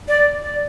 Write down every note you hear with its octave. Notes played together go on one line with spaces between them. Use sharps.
D5
D5